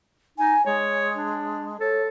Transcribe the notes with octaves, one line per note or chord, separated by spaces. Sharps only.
D#4 G#5
G#3 C#5
D4
A4 C#5